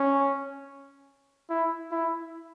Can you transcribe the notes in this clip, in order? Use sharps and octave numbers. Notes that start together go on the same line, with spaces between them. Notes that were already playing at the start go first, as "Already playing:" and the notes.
Already playing: C#4
E4
E4